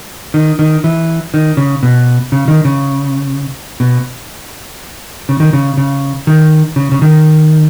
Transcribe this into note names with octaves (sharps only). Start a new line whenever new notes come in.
D#3
D#3
E3
D#3
C#3
B2
C#3
D#3
C#3
B2
C#3
D#3
C#3
C#3
D#3
C#3
C#3
D#3